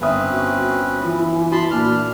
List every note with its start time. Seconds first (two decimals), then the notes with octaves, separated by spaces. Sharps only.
0.01 G1 C4 C#4 B4 E5 D#6
0.31 F#4
1.03 E3 F4
1.52 F#4 A5 B5 C6
1.71 A#2 D4 F6